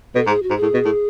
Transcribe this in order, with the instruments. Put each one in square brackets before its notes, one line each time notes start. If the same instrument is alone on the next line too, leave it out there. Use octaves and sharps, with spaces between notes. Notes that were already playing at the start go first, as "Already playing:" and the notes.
[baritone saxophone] B2 [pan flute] A4
[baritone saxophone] G#2
[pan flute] G#4
F#4
[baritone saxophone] G#2
[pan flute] G#4
[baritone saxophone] A2
B2
A2